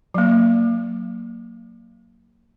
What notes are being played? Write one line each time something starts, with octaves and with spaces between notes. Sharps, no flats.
F#3 A#3